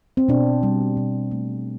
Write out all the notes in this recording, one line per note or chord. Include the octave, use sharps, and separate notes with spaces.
C4
B2 D4
G3
B2
A3